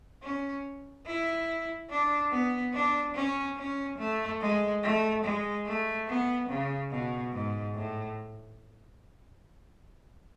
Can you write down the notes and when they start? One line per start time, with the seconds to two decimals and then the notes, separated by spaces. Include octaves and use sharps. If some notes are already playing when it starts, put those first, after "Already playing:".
0.23 C#4
1.07 E4
1.90 D4
2.32 B3
2.74 D4
3.15 C#4
3.57 C#4
3.98 A3
4.41 G#3
4.83 A3
5.24 G#3
5.66 A3
6.08 B3
6.49 C#3
6.91 B2
7.33 G#2
7.75 A2